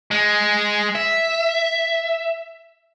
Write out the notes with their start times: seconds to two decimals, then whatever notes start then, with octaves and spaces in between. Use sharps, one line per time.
0.11 G#3
0.95 E5